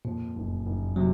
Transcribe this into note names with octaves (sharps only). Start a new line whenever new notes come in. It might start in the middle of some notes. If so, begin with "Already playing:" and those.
F2 A#2
F#1
F#1
C3 F#3